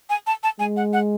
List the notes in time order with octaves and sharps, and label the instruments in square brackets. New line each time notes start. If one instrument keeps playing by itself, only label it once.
[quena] G#5
A5
A5
[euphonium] G#3 [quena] G#5
[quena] F#5
F#5